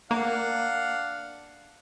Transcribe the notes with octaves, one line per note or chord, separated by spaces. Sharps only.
A#3 D4 F5 F#5